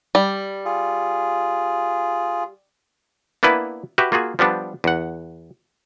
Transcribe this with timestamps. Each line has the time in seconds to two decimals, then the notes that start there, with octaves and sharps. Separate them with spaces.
0.15 G3
0.65 F4 G#4
3.43 A#3 B3 D4 E4 B4
3.98 F#4 G4 B4 E5
4.12 A#3 F4 F#4 G#4
4.39 F3 G3 B3 D4
4.84 E2 F#5